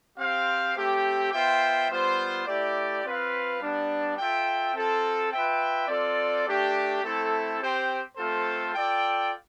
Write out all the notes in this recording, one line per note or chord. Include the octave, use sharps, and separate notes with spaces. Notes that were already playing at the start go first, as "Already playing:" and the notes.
C4 G4 C5 F5
A3 C4 G4
B3 F4 C5 E5 G5
G3 B3 F4 C5
A3 E4 G4 D5
C4 F4 B4 F5
G3 B3 D4
F4 A4 E5 G5
C4 F4 A4
F4 B4 E5 G5
C4 F4 A4 D5
A3 D4 G4
A3 C4 E4 A4
C4 G4 C5 G5
A3 C4 F4 A4 C5
F4 A4 D5 G5